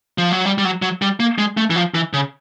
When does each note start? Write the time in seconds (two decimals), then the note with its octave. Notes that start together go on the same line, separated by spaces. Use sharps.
0.18 F3
0.32 F#3
0.46 G3
0.58 G3
0.64 F#3
0.82 F#3
1.02 G3
1.20 A#3
1.38 G#3
1.57 A3
1.70 E3
1.76 F3
1.94 E3
2.13 C#3